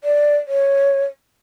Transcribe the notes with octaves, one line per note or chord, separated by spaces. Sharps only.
D5
C#5